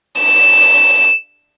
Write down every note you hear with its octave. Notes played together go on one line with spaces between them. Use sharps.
E7